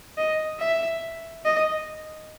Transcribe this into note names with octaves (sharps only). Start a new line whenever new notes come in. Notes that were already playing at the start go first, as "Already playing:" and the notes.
D#5
E5
D#5